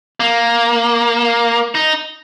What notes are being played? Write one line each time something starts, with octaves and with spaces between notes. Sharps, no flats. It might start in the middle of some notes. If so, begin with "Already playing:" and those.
A#3
D#4